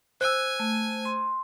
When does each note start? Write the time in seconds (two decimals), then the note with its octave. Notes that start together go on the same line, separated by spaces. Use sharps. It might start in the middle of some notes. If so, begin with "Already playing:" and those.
0.21 C5 G#5 E6 F#6
0.60 A3
1.05 C6